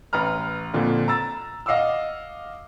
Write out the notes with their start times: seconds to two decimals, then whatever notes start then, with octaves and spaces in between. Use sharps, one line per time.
0.13 A1 B4 A#5 F6
0.73 F2 A#2 D3
1.08 A#5 E6 A6
1.66 D#5 F5 F#5 D6 E6